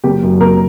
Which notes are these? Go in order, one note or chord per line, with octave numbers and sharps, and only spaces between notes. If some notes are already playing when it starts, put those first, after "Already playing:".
F#1 G4
F#2
F#1 A#4